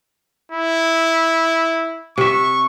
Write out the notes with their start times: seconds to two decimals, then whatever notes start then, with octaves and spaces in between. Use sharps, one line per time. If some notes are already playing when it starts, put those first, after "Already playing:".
0.52 E4
2.18 C3 E5 C#6